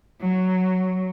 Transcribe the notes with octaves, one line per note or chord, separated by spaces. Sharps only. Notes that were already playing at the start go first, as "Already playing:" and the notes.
F#3